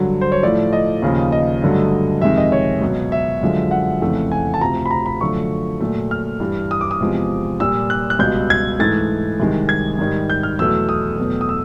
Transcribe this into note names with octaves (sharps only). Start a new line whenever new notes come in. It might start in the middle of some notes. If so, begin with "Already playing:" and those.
Already playing: G2 D3 F#3
C5
C#5
A2 F3 A3 D5
D#5
D#2 C#3 F3
D#5
G2 D3 F#3 A3
F2 C3 D#3 G#3 E5
D#5
C#5
C#2 B2 F#3
E5
F#2 D3 F3 G#3
F#5
F2 C#3 E3 A3
G#5
A5
D2 C3 F3 A#5
B5
A#5
B5
F#2 D3 F3 A3 C#6
A#2 F#3 A3
F6
G2 E3 G3
D#6
D6
D#6
E2 C3 F3 G#3
A#2 G3 E6
F#6
F#6
C#2 B2 G3 G6
G#6
G#2 E3 A3 A6
C2 C3 D#3 G#3
G#6
G#2 D#3 G3
G6
F6
E2 B2 F#3 A3 E6
D#6
E2 B2 F#3 A3
D#6
E6